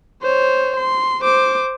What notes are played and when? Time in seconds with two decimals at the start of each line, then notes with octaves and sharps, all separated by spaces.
0.22 C5 C#5
0.77 C6
1.22 C5 D6